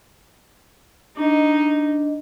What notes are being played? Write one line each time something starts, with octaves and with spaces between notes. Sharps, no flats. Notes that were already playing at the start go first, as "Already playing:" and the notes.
D4 D#4 D#5